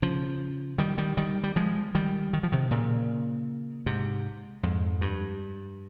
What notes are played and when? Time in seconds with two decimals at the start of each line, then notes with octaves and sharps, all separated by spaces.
0.02 C#3 F3
0.78 D#3 G3
0.98 D#3 G3
1.17 D#3 G3
1.44 G3
1.56 F3 G#3
1.95 D#3 G3
2.33 D#3
2.43 F3
2.52 C3 D#3
2.71 A#2 C#3
3.86 G#2 C3
4.63 F2 G#2
5.01 G2